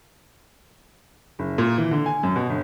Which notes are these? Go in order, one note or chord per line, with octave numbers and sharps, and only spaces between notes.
F#1
A#2
E3
D3
G#5
F#2
B2
G1